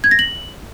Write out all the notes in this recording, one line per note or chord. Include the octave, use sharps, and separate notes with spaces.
G#6
A#6
F#7